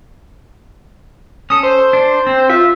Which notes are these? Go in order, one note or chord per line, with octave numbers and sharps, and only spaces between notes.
C#4 A4 D#6
C5
D4
C4
F4 E5